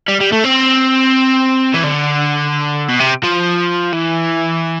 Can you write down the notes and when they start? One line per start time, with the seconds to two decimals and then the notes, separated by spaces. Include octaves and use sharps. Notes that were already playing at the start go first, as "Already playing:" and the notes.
0.08 G3
0.20 G3
0.32 A3
0.44 C4
1.74 E3
1.84 D3
2.89 B2
3.00 C3
3.23 F3
3.93 E3